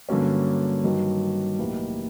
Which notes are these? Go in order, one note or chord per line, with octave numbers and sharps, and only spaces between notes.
G2 D3 F#3 A#3 C#4
G2 D#3 F#3
B1 A2 E3 G3 A#3